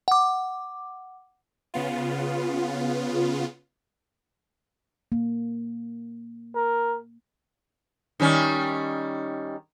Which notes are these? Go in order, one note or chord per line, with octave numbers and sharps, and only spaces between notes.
F#5 D6
C#3 B3 F4
A#3
A#4
D#3 G3 C#4